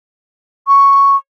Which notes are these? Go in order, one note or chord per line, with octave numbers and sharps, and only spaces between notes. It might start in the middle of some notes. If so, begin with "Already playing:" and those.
C#6